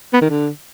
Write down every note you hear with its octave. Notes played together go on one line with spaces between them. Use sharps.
B3
D#3
D3